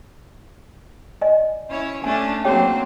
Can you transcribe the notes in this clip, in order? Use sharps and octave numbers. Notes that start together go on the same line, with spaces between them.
D5 D#5 G#5
C#4 E4 C#5
A3 C#4 D4 G#5
F#3 A#3 C4 G#4 C#5 G5